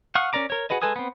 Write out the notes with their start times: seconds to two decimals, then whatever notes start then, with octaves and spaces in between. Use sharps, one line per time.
0.15 F5 F#5 C#6 D#6
0.33 C#4 A#4 D5 A#5 D6
0.50 A#4 C#5
0.70 F#4 G#4 B4 D#5
0.82 G#3 A4 B4 G#5 D#6
0.96 B3 C4